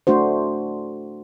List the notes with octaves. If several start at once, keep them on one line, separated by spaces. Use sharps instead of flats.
A3 D4 F#4 C5